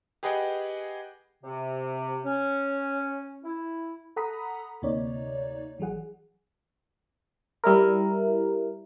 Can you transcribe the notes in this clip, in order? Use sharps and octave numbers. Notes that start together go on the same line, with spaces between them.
G4 G#4 B4 D#5 F#5 G5
C3
C#4
E4
A4 F#5 A#5 B5 D#6 B6
D2 C3 A#3 D#4 C#5 D5
A1 E3 F#3 G#4 F#5
G3 E4 A#4